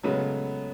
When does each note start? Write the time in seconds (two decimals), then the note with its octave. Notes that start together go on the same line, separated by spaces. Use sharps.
0.03 C#3 F#3 G#3 A3 B3